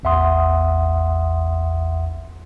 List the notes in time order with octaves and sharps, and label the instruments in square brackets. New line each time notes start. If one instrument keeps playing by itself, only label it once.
[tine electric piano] A1 E2 E5 F#5 C6 D#6